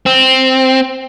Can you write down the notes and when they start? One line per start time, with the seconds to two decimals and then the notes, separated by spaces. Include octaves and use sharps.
0.06 C4